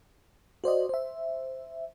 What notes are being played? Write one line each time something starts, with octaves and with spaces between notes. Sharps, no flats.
F#4 C5 D5 D#5
C5 E5